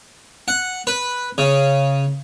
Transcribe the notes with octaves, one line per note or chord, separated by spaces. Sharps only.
F#5
B4
C#3